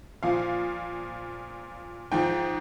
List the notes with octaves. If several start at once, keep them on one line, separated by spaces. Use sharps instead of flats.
A#2 F3 F5
G#2 F3 G5